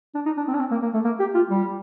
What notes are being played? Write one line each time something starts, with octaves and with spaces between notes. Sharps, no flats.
D4
D#4
D4
C4
D4
C4
A#3
A#3
A3
A#3
G4
F4
G3